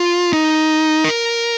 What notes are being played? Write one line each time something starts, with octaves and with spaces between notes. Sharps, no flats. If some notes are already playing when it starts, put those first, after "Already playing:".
Already playing: F4
D#4
A#4